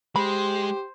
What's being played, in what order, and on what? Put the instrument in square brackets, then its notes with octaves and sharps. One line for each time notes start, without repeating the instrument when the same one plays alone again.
[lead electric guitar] G#3 [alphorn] G4 [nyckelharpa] C5 [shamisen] B5